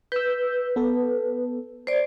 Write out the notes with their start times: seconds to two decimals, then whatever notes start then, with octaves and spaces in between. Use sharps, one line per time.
0.12 B4 E6 G6
0.76 B3 A4
1.87 C5 D5